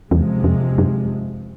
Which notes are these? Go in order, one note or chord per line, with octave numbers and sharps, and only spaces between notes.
E2 C3 F3 G#3
F2
F#2